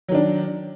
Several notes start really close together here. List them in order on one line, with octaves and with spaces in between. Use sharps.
F#3 D#3 D4